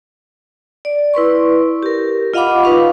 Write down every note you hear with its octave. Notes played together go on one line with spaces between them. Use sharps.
D5
E4 B4 C6 C#6
G4 A#4
F4 D#5 F5 F#5 B5 D6
D#4 B4 F5 C#6